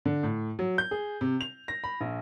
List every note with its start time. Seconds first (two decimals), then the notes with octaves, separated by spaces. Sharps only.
0.05 D3
0.23 A2
0.59 F#3
0.78 G6
0.91 G#4
1.21 C3
1.41 F7
1.68 A#6
1.84 B5
2.01 A#1